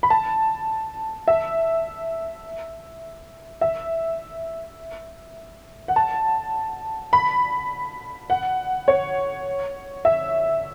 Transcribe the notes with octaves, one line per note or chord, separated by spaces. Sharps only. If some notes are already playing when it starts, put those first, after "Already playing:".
B5
A5
E5
E5
F#5
A5
B5
F#5
C#5
E5